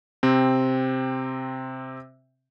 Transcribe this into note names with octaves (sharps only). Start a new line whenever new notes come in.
C3 C4